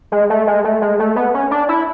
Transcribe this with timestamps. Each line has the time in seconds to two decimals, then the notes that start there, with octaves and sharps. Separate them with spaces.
0.12 G#3
0.30 A3
0.47 G#3
0.64 A3
0.82 G#3
0.99 A3
1.16 B3
1.34 C#4
1.51 D4
1.69 E4